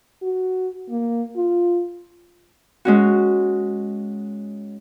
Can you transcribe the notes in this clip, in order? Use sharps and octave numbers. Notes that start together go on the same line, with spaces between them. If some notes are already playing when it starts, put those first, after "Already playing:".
F#4
A#3
F4
G#3 C#4 F#4